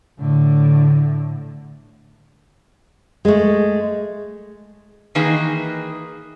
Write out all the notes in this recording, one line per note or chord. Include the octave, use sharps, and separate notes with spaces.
A2 D3
G#3 A3
D#3 E3 A#3 D#4 G#4 B4